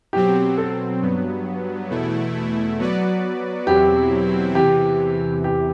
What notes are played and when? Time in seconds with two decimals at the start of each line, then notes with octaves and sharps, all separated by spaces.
0.13 B2 F#3 C4 G4
0.58 A4
1.01 G2 F#3 B3
1.90 E2 B2 A3 E4
2.79 F#3 B3 F#4 B4 D5
3.67 E2 B2 F#3 C4 E4 G4
4.55 E2 C3 E3 G4
5.44 G4